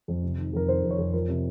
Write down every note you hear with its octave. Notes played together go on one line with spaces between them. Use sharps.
F2
C3
D#3
F2 A#4
D#3 C5
F2
C#5
F2
F3 A#4
C3